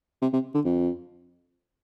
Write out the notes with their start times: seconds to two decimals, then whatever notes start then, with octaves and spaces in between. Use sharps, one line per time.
0.22 C3
0.33 C3
0.55 D3
0.65 F2